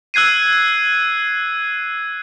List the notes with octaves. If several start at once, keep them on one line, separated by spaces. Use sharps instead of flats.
E6 F#6 G#6 C7 D#7